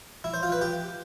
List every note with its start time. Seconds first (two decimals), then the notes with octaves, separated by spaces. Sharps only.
0.24 E4
0.34 C5
0.43 F4
0.52 B4
0.61 G4